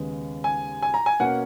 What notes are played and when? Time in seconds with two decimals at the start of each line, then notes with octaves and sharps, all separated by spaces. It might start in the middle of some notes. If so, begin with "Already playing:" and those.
Already playing: D#2 C#3 G#3 B3
0.44 G#5
0.82 G#5
0.94 A#5
1.06 G#5
1.20 B2 A#3 C#4 F#5